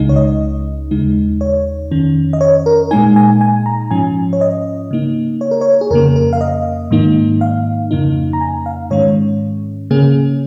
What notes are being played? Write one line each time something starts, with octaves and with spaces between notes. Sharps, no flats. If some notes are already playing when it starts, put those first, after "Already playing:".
Already playing: C#2 C#3 G#3 D#4
C#5
D#5
D#2 C#3 G#3 D#4
C#5
F2 D#3 C#4
D#5
C#5
A#4
A#2 G#3 D#4 G#5
G#5
G#5
A#5
G#2 F3 C#4 G#5
C#5
D#5
C#3 A#3 D#4
C#5
A#4
C#5
G#4
F2 C#3 A#3 A#4
A#4
F5
D#5
G#2 D#3 A#3 D#4
F5
F2 C#3 A#3 D#4
A#5
G#5
F5
G#2 D#3 G#3 C#4 C#5
C#3 A#3 C#4 G#4